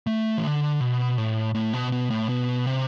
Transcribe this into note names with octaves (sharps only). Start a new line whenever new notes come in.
A3
E3
D3
B2
A2
A2
B2
B2
A2
B2
C3